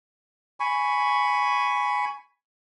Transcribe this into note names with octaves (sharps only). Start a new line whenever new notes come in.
G#5 B5 C#6